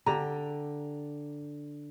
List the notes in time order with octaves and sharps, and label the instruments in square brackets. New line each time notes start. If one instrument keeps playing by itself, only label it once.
[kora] D3 [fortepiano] G4 A#5